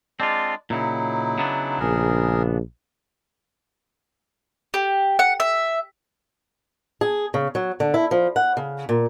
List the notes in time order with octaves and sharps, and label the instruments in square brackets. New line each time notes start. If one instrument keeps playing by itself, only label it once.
[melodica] G#3 D4 D5 [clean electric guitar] C4 F4
[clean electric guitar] A#2 C#3 [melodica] F#3 D#4 E4
[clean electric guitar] C#3 B3 D4
[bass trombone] A#1 [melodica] G#4 A#4
[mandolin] G4
F#5
E5
[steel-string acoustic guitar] G#4
C#3
F#3
D3
E4
F3
F#5
C#3
A#2